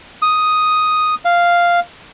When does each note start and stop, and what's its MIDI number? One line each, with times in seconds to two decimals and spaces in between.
0.22 1.15 87
1.25 1.80 77